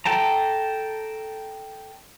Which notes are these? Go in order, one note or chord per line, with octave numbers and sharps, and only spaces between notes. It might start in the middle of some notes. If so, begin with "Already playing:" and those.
A4 G5 A5 A#5